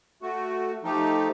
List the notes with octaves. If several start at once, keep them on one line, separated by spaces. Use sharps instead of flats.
A3 F#4
F3 A3 D#4 G4